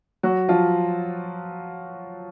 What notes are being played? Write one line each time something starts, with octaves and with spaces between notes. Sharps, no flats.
F#3 F#4
F3 F4